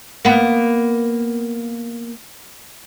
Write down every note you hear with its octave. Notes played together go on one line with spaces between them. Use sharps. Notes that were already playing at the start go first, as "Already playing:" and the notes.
A#3 B3